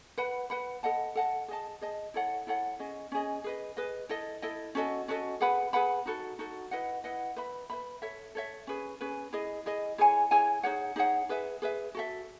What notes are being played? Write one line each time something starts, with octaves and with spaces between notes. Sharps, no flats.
B4 F#5 B5
B4 F#5 B5
A4 D#5 F#5 A5
A4 D#5 F#5 A5
G#4 D#5 A5
G#4 D#5 A5
E4 A4 C#5 F#5
E4 A4 C#5 F#5
C#4 G#4 D#5
C#4 G#4 D#5
G#4 B4 D#5
G#4 B4 D#5
E4 A4 D#5
E4 A4 D#5
C#4 F#4 A4 D#5
C#4 F#4 A4 D#5
G#4 B4 F#5 B5
G#4 B4 F#5 B5
D#4 F#4 A4
D#4 F#4 A4
E4 B4 D#5 F#5
E4 B4 D#5 F#5
B4 E5 B5
B4 E5 B5
A4 C#5 E5
A4 C#5 E5
C#4 G#4 B4
C#4 G#4 B4
E4 G#4 D#5
E4 G#4 D#5
E4 G#4 C#5 G#5
E4 G#4 C#5 G#5
D#4 G#4 C#5 F#5
D#4 G#4 C#5 F#5
G#4 B4 E5
G#4 B4 E5
F#4 A4 E5